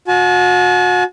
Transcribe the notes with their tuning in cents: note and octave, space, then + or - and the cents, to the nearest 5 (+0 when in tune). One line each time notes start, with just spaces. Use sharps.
F#4 -35 A5 -45